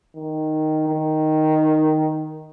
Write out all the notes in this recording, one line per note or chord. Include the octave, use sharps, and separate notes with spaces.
D#3
D#3